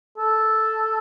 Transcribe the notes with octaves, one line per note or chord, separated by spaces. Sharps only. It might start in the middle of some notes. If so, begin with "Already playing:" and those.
A4